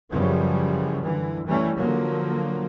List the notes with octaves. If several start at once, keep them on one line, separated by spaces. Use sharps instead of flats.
F#2 C#3 E3 F3 G3
D3 E3
E3 G3 A3 C#4
D3 F3 F#3 A#3